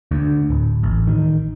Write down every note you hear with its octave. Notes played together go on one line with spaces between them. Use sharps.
D2
D1
A1
D#3